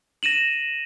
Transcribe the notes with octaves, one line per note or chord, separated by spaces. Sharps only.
A#6 D#7 E7 F#7